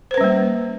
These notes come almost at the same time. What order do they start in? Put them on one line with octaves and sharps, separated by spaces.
C5 B4 C#4 G3 A#3